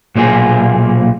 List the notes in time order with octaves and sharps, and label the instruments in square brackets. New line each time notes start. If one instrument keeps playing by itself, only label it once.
[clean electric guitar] B1 A#2 A#3 G#4